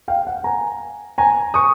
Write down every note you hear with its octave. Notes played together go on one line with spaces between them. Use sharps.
F5 G5
F#5
G#5 A#5
G#5 A#5
C#6 D#6